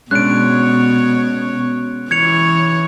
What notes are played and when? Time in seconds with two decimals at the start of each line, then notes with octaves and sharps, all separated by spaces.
0.11 B2 G#3 C#4 D4 C#5 F#6 D7
2.11 E3 C#5 G#6 C#7 F7